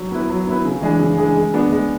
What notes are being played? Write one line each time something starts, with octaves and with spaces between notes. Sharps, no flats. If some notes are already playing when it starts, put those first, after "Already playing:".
Already playing: F#3
B3 E4 B4
F#3
B3 E4 B4
C#3
E3 G#3 D4 G#4
C#3
E3 G#3 D4 G#4
G#3
B3 D4
G#3